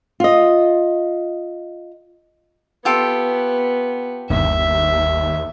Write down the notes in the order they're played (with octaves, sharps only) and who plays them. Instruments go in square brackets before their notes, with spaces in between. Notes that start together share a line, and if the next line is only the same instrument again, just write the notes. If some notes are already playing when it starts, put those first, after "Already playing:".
[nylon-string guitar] F4 D#5
[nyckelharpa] B3 [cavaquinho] F4 G4 A4
[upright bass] G1 [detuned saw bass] D#2 [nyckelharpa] E5